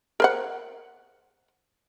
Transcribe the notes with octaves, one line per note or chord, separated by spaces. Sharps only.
A#4 C5 F#5